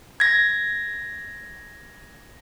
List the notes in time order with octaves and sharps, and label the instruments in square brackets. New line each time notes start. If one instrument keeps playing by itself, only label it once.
[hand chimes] G#6 A#6